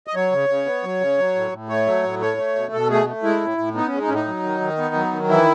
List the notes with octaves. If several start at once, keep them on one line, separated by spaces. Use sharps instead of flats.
D#5
F#3 C#5
C#3
C#3
B3
F#3
C#3
F#3
A2
A2
A3 C#5
F#3
A2
A3 C#5
A3
B2
B2 A4
A3 G#4
A3
G#3 E4
A2
A2
B3 D#4
G#3 C#4
D#4
A2 C#4
D#4
F#3
D#3
D#3
B3
F#3
D#3
E3 E4